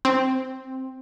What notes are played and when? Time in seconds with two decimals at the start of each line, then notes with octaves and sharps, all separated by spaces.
0.05 C4